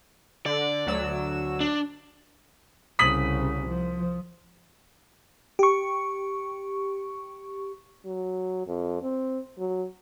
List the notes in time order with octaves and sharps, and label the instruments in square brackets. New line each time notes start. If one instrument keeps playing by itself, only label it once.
[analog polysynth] D3 [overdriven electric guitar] D5
[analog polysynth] D2 F#3 E6
[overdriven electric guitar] D4
[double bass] C2 C#3 [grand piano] D#6 B6 F#7
[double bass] F3
[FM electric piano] G4 C#6
[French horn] F#3
F2
C4
F#3